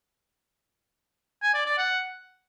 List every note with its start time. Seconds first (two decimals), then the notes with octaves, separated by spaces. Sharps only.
1.43 G#5
1.54 D5
1.66 D5
1.78 F#5